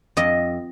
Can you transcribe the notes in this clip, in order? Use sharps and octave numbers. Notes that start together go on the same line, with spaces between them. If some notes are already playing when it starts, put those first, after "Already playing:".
F2 D#5